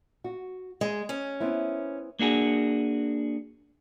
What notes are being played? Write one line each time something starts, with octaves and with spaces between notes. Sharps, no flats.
F#4
G#3 D#5
C#4
B3 C4 E4
A#3 D4 F#4 G#4